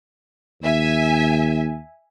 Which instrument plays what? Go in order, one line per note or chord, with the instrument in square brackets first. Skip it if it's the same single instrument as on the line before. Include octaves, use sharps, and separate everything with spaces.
[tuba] D#2 [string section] E5 G#5